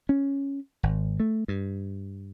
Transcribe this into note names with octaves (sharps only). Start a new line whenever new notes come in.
C#4
G#1
A3
G2